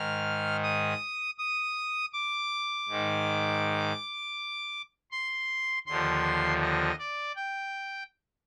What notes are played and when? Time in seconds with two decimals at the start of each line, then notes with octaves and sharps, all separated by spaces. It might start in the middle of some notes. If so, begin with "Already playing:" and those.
Already playing: G#2 D#3 F6
0.63 D#6
1.38 D#6
2.13 D6
2.89 G#2 D#3
5.12 C6
5.86 D#2 D3 F3 C6
6.62 D#5
6.98 D5
7.36 G5